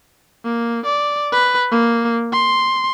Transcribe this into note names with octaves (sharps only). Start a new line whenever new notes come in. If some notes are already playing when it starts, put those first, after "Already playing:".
A#3
D5
B4
A#3
C6